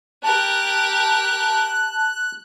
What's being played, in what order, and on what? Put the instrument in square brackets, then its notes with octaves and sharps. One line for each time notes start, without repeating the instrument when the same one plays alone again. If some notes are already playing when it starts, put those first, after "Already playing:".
[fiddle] G4 A#4 [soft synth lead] A5 [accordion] F#6